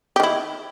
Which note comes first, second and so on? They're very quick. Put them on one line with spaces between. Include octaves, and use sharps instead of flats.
G4 D#3 E4